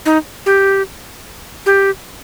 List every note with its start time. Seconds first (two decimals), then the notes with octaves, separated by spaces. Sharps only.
0.06 D#4
0.46 G4
1.66 G4